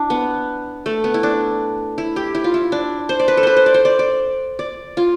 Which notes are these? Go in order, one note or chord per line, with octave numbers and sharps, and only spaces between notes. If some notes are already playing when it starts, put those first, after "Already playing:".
Already playing: D4 E4
B3
A3
B3
E4
D4
E4
G4
E4
F4
E4
D4
C5
D5
B4
A4
B4 C5
C5
D5
C5
D5
D5
D5
F4